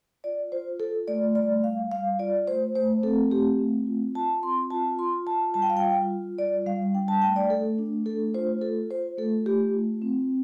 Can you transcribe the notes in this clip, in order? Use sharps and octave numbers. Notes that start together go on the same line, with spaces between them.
F4 D5
F4 C5
F4 A4
A3 D5
G3 D5
G3 F5
G3 F5
F4 D5
A3 C5
A3 C5
C4 A4
A3 G4
C4
F4
F4 A5
C4 C6
F4 A5
F4 C6
F4 A5
G3 A5
G5
F5
G5
F4
F4
G3 D5
G3 F5
D4 G5
A5
A3 G5
D5
A3 A4
D4
A3 A4
F4 C5
F4 A4
F4 C5
A3 A4
A3 G4
F4
C4